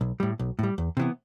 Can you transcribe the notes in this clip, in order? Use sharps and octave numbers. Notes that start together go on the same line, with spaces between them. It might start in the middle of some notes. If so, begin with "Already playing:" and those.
B1
A2 G3
B1
A2 G3
E2
C3 E3 B3